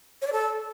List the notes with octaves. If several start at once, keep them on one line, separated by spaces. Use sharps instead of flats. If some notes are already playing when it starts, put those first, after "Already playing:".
C#5
D5
A4